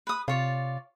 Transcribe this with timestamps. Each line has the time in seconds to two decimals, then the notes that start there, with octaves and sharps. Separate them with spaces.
0.07 B4 D#6
0.28 C3 F4 C#5 D5